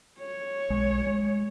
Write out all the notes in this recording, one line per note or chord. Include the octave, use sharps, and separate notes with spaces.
C#5
B1 G#3
G#3